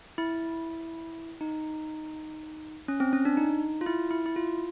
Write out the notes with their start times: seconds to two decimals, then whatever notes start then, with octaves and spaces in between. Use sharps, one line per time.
0.18 E4
1.41 D#4
2.88 C#4
3.00 C4
3.13 C#4
3.25 D4
3.37 D#4
3.81 F4
3.86 E4
4.11 E4
4.26 E4
4.36 F4